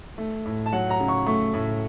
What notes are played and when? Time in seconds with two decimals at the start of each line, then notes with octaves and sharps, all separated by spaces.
0.18 A3
0.46 A2
0.66 A5
0.72 F#3 F#5
0.90 A#5
1.00 C#3
1.08 C#6
1.26 A3 C#6
1.54 A2